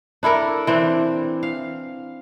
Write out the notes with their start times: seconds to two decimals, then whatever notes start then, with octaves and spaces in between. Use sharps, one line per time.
0.23 D4 E4 A4 A#4
0.67 E3 C4 D4
1.43 F5